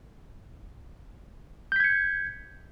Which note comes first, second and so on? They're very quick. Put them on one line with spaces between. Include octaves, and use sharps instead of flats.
G6 B6 G#6 C#7